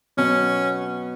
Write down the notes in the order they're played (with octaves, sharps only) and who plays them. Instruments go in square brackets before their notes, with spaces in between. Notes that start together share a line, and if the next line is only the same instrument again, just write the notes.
[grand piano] B2 F#3 B3 [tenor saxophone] C#4